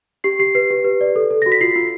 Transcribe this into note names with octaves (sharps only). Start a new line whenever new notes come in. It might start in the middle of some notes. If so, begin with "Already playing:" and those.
G4 C7
G4 C7
B4 C7
G4
B4
D5
A4
A4
F#4 A#6
B6
F4 C7
F4